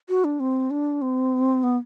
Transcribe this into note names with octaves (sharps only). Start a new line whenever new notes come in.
F#4
D4
C4
D4
C4
B3